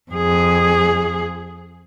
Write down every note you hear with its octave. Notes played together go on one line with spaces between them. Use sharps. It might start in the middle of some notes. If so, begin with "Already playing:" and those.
F2 G#4